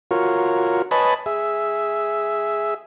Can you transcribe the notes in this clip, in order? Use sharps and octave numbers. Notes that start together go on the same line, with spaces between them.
F4 F#4 A#4 C#5
B4 C#5 D#5 G#5 A5 B5
G#4 E5